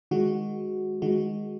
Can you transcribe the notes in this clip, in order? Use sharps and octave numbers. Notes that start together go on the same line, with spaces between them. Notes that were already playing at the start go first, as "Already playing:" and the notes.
D#3 G#3 F#4
D#3 G#3 F#4